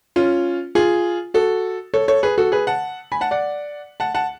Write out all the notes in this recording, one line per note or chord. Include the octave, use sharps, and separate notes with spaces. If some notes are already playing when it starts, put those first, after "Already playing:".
C#4 F4
F4 G#4
F#4 A4
A4 C#5
A4 C#5
G#4 B4
F#4 A4
G#4 B4
F#5 A5
G#5 B5
F#5 A5
D5 F#5
F#5 A5
F#5 A5